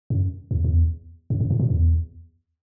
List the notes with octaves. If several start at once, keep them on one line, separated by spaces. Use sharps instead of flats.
F#2
E2
E2
F#2
F#2
G#2
A#2
E2